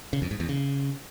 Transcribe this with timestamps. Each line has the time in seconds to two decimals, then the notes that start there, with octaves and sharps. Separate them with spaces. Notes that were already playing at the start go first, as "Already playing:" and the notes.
0.13 C#3
0.22 F2
0.31 G#2
0.40 E2
0.49 C#3